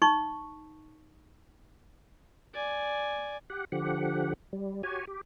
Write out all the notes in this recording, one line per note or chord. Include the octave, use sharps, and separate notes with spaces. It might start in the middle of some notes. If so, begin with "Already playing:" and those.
D#4 C#6
D5 G#5
G4 F#5
D3 F3 G4 F#5
G3
F#4 G4 C#5 G#5
G4